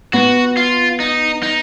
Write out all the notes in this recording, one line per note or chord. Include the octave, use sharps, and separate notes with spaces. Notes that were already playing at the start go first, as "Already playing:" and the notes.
B3 F#4
F4
D#4
D#4